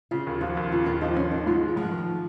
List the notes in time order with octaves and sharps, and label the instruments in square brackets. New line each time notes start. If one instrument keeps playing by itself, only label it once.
[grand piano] C#3 [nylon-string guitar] F4
[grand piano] D#2
[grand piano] F3 [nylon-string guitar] F#4
[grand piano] D#2
[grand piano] C#3 [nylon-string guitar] F4
[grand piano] D#2 [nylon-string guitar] F4
[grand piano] F3 [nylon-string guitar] D#4
[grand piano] D#2 [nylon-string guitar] C#4
[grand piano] D#3 [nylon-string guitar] D#4
[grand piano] G#2 [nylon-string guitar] F4
[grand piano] G#3
[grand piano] G#2 [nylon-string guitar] F3
[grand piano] D#3